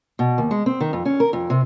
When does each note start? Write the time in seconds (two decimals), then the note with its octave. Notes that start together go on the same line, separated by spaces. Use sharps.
0.19 B2
0.38 D#2
0.51 G#3
0.66 C4
0.80 D#3
0.93 F2
1.05 C#4
1.20 A#4
1.33 F2
1.50 C3